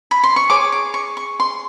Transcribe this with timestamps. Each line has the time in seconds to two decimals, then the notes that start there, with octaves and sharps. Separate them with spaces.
0.11 B5
0.23 C6
0.36 C#6
0.50 G#4 C#5 D6
0.72 D6
0.94 C#6
1.17 C#6
1.40 C6